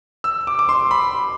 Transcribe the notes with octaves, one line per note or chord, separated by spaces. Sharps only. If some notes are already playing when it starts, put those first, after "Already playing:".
E6
D6
D6
C6
B5